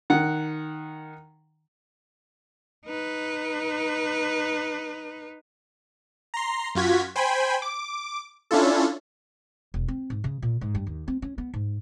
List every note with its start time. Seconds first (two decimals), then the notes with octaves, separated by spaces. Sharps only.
0.10 D#3 F#5
2.86 D#4 B4
6.34 A#5 C6
6.75 F#2 F4 F#4 G#6 B6
7.16 C5 G5 G#5 B5
7.62 D6
8.51 C#4 D4 E4 F4 A4
9.74 E1
9.88 C4
10.10 G#2
10.24 C#3
10.42 A#2
10.61 G#2
10.75 G2
10.87 D#2
11.08 C4
11.22 C#4
11.38 B3
11.54 G#2